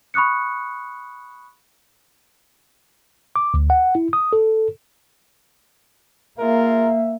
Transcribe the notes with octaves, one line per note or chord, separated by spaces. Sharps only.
B5 C#6 D#6 F#6 C#7
D6
D2
F#5
E4
D#6
A4
A#3 F4 G#4 A#4 E5